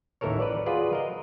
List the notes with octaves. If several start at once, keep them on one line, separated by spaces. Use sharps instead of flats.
A1 D#2 E3 A4 A#4 C#5
B4 D5
F4 F#4 G#4 B4 D5
A#4 D#5 F#5